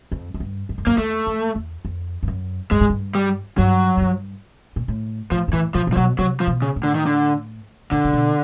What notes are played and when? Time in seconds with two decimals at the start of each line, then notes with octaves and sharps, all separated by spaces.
0.12 F2
0.34 F#2
0.40 G2
0.69 F#2
0.78 F2
0.86 F#2 A#3
0.98 E2 A3
1.27 F2
1.55 E2
1.85 F2
2.23 G2
2.28 F#2
2.71 G2 G#3
2.81 G#2
2.90 G2
3.15 G3
3.58 G2 F#3
3.97 F#2
4.02 G2
4.76 A#2
4.88 A2
5.31 A2 F3
5.48 G#2
5.53 A2 E3
5.75 A#2 F3
5.87 A#2
5.93 F3
5.97 B2 F#3
6.19 C3 F#3
6.40 F3
6.47 B2
6.62 C#3
6.76 A2
6.83 D3
6.95 D#3
7.06 D3
7.91 A#2 D3
8.05 C3
8.13 B2